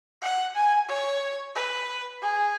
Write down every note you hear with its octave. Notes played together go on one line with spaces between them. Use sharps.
F#5
G#5
C#5
B4
G#4